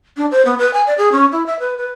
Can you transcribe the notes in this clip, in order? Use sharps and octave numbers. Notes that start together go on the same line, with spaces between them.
D4
C5
B3
B4
G#5
D5
G#4
C#4
E4
E5
B4
B4